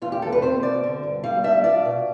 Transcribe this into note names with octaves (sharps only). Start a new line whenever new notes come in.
E2 F4
G4
E2 A4
B4
C4 C5
B2 D5
D3
G2
G3 F5
D4 E5
F4 D5
B2